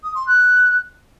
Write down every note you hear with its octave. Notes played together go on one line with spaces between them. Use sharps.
D#6
C6
F#6